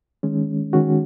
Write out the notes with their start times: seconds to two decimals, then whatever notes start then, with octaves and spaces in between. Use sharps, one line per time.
0.23 D#3 G#3 C#4
0.73 D#3 G#3 C#4 F#4